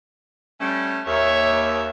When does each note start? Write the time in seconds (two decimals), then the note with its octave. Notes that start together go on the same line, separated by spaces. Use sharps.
0.60 G3 A3 C#4
1.07 D#2 C#5 E5